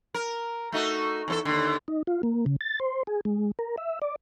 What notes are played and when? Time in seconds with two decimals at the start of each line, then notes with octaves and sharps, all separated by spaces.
0.14 A#4
0.72 A3 D#4 F#4
1.28 E2 C#4 A4
1.45 D#2 D3
1.88 D#4
2.07 F4
2.23 A#3
2.46 C#3
2.61 A6
2.80 C5
3.07 G#4
3.25 G#3
3.59 A#4
3.78 E5
4.02 D5